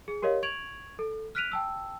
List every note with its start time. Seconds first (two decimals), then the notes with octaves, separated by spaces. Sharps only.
0.08 G#4
0.22 G4 A#4 C#5 D#5 F5
0.43 C#6 G#6 D7 F7 F#7
0.99 A4
1.35 F6 F#6 B6 D7 D#7 F7
1.52 G5 A5 E6